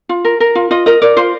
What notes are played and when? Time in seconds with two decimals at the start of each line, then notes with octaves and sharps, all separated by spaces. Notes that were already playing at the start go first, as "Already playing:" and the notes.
0.09 F4
0.25 A#4
0.40 A#4
0.55 F4
0.71 F4 D#5
0.86 A#4 D#5
1.02 A#4 D5
1.17 F4 C5